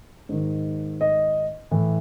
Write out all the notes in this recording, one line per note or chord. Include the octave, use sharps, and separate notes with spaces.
G#2 D#3
D#5
A2 E3